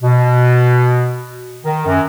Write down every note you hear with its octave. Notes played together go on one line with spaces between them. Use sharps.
B2
D#3
F#2